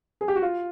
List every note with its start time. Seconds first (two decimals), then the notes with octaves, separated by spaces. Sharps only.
0.21 G#4
0.28 G4
0.35 F#4
0.42 F4